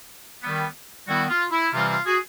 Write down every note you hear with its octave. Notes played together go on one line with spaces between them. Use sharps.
D#3 G3 B3
D#3 G3 B3 E4 F#4
F4
E4
C3 E3 G3 C4 F4
F4
F#4 G#4